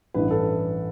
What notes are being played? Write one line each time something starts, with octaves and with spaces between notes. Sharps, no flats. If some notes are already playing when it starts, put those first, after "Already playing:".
A1 G2 E3 B4
A4